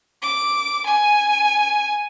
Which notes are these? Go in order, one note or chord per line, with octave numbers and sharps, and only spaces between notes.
D6
G#5